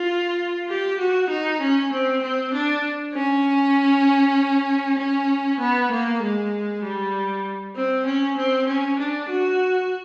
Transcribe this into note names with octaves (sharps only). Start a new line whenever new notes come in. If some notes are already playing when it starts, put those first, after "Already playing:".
Already playing: F4
G4
F#4
D#4
C#4
C4
C4
D4
C#4
C#4
B3
A#3
G#3
G3
C4
C#4
C4
C#4
D4
F#4